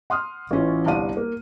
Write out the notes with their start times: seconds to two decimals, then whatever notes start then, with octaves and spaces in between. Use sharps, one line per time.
0.10 F#5 C6 D#6 F6
0.51 A1 E3 C#4 F4
0.86 G1 C2 D5 F5 D#7
1.17 A#3